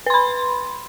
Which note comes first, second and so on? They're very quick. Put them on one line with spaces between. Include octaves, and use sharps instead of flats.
B4 C6 B5